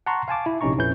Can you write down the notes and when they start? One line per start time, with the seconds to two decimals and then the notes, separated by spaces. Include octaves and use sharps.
0.06 F#5 A5 A#5 C6 C#6
0.28 F5 G#5 A5 D6
0.46 E4
0.61 A#1 C3 C#4 D#4 A#5 C#6
0.78 F2 A#2 C#4 E4 B4 G6